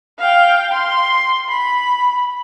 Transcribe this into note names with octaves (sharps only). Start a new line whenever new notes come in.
F5 G5
C6
B5